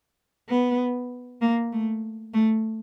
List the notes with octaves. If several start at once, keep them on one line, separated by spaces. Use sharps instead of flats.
B3
A#3
A3
A3